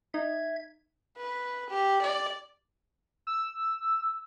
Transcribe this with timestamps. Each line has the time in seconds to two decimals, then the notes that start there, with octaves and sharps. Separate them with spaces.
0.14 D#4 E5 G#6
1.17 B4
1.70 G4
2.02 D5
3.27 E6